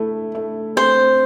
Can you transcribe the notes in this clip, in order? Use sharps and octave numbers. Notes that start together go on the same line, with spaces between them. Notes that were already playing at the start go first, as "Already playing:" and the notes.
Already playing: A3 E4
A3
C4 C5